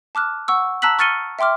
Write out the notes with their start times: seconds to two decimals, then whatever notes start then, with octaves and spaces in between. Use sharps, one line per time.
0.15 A5 D6 F6 F#6
0.48 F#5 C#6 E6
0.82 A5 A#5 E6 F#6 B6 F#7
0.99 C#6 F6 A6 C#7 D#7 G7
1.39 E5 G5 C6 D6 F6